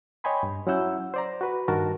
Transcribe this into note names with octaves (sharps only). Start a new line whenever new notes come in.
C#5 D#5 G5 G#5 B5 C6
G2
F#3 C#4 E4 F#5 E6 G6
C5 D5 A#5
F#4 B4
G2 D#3 F#4 A#4 A5